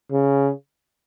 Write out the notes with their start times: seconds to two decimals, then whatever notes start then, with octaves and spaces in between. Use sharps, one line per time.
0.12 C#3